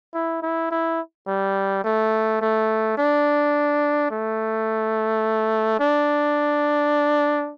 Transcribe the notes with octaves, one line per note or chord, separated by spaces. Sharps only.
E4
E4
E4
G3
A3
A3
D4
A3
D4